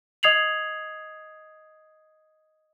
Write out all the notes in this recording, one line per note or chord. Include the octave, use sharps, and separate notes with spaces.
D#5 D#6 G#6 C7 F7 F#7